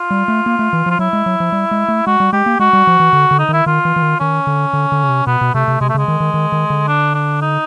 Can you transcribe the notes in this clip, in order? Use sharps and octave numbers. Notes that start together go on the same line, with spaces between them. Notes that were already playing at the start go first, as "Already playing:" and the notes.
Already playing: F4
G3
A3
A#3
A3
E3
F3
F4
F#3 E4
G#3
F#3
F3
G3
G#3
A3
G#3 F#4
G3
G#3 G4
A#3
G#3 F#4
G3
F3
E3
D3
D3
D#4
D#3 E4
D#3 F4
E3
E3
D#3
D#3 C#4
D3
D3
D3
C#3
C3
B2 B3
B2
C3 A3
C3
C3 G#3
A3
C#3 G#3
D#3
D#3
D#3
D#3
D3
D4
D4
D#4